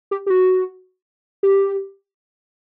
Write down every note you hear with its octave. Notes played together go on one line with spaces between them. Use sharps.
G4
G4
F#4
G4